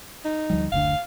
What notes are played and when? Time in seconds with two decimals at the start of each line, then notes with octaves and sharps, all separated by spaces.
0.25 D#4
0.50 D2 F3 G3
0.72 F#1 D2 D3 F5